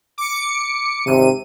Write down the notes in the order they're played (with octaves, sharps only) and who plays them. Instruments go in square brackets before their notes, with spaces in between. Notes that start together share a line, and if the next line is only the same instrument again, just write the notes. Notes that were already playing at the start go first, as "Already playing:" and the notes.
[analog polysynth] D6 C#7
[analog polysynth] G#1 D#7 [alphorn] C3